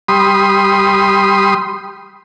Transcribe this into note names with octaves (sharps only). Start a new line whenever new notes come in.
G3 B5 C6 D#6